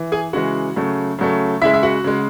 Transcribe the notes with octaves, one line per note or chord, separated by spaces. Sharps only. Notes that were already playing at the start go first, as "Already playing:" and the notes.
Already playing: E3
G#4 G#5
C#3 E3 G#3 F#4 F#5
C#3 F#3 A3
C#3 F#3 A3
C#3 G#3 E4 E5
E5
F#4 F#5
C#3 G#3